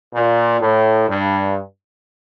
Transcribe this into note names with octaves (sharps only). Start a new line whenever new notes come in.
A#2
A2
G2